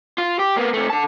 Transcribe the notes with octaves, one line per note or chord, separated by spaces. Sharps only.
F4
G4
A#3 B3
C3 A3
D3 A5